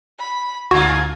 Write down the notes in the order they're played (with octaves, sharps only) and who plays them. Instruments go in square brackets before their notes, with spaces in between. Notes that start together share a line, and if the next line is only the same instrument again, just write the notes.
[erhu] B5
[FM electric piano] D2 D3 [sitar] G2 F4 [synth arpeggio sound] F#4 [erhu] G#6